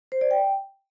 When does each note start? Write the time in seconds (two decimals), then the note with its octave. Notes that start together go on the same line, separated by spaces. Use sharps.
0.12 C5
0.21 D5
0.31 G5